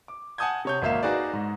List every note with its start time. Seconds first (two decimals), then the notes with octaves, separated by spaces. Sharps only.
0.08 D6
0.38 F#5 G#5 A5 D#6 G6 G#6
0.65 C3 C#5 G6
0.82 G#1 A#3 E5 F5 E7
1.03 D#4 F#4 G#4 B4 D5
1.33 G#2